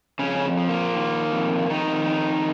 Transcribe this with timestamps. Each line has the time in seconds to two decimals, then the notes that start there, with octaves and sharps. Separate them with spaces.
0.19 F2 C#3 C#4
0.57 F3
0.69 A#3
0.95 D#3
1.32 F2
1.70 F2 D#3 D#4
2.07 D#3